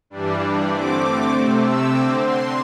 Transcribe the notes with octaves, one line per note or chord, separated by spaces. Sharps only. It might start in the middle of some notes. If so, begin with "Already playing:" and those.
G2 E3 G3 D4
D3 A3 C4 D6
C3 A3 C4
E6
D3 C4 D6
C6